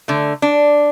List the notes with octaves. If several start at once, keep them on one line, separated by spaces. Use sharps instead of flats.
D3 A3
D4